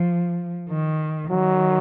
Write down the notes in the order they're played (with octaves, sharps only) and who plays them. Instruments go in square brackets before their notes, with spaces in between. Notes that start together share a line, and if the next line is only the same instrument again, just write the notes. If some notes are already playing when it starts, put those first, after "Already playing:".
Already playing: [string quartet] F3
D#3
[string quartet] D#3 [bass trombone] F#3